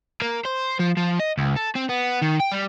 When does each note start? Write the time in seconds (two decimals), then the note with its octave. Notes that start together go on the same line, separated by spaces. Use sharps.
0.22 A#3
0.45 C5
0.80 F3
0.97 F3
1.20 D#5
1.38 C#2
1.56 A4
1.75 C4
1.89 B3
2.22 D#3
2.40 G5
2.52 G3